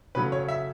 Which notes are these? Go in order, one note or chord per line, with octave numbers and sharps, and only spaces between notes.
C#3 F#3 A3 B4
C#5
E5